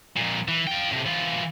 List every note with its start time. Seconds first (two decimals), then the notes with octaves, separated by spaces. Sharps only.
0.16 F2 A#2
0.48 E3
0.67 F4 G5
0.91 A2 C3
1.06 E3 F4